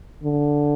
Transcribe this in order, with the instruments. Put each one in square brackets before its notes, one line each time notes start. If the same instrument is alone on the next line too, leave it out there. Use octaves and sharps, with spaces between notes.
[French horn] D3